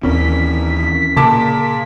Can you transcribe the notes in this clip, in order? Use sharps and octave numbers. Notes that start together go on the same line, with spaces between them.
D#2 E3 C4 C#4 A#4 B6
A#2 C#3 A#4 A5 D6